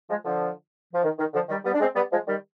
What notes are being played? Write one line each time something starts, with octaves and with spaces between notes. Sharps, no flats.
F3 G#3
D3 F3
F3
D#3
D#3
D3 F3
D#3 G3
G3 B3
D4
G#3 C4
G3 B3
F3 G#3
D#3 G3